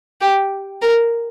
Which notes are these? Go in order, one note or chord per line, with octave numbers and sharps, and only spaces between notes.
G4
A#4